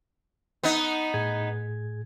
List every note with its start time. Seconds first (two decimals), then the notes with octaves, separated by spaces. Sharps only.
0.63 B3 D#4
1.14 A2 G#4 G#6